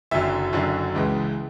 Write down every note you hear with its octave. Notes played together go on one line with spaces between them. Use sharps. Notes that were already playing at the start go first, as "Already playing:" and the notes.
F#1 F#2 D3 F#3 E5
F#1 F#2 D3 F#3
C#2 C#3 E3 G#3